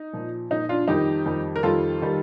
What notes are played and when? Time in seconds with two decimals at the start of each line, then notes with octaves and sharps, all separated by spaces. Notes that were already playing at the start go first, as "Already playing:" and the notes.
Already playing: D#4
0.13 A#2 F3
0.50 A#2 F3 D#4
0.69 D4 F4
0.88 F2 D#3 G3 D#4 G4
1.26 F2 D#3 G3
1.56 A#4
1.63 F2 D#3 G3 F4 A4
2.02 D#3 G3